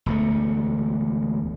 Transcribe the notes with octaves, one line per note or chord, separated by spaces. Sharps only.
E1 D2 A3